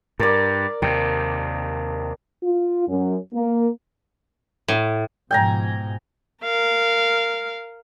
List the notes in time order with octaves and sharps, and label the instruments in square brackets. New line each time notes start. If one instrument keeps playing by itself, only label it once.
[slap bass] G2 [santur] A#4 D5
[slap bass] D#2 C3 [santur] G5
[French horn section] F4
F#2
A#3
[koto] A2
[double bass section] G#2 B2 F3 [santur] G5 G#5 A#5
[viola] A#4 F5